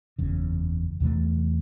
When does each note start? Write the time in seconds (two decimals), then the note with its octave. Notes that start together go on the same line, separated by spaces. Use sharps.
0.19 F#1 E2 C#3
1.00 E2 C3 E3 A3